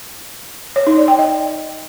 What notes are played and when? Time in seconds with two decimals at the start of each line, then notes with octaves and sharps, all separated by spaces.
0.76 C#5
0.87 D#4
0.97 D5
1.08 G5
1.19 D#5